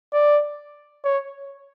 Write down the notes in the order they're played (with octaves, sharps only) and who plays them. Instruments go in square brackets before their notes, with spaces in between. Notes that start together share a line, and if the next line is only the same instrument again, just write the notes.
[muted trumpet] D5
C#5